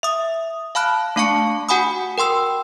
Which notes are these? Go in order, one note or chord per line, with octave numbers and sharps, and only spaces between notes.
E5 D#6
F5 A5 B5 F6 F#6
A3 D4 F5 A5 C#6 C#7
F#4 F#5 G#5 B5 D#6
A#4 G5 C6 E6